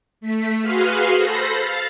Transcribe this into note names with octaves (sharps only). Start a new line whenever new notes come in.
A3 B6
F#4 G#4 B4 F5 C6 F6
A4 C5 B5 A#6
F5 A6 C7